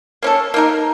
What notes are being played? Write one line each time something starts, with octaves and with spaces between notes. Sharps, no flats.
A#3 C#4 A4
A#3 D#4 A#4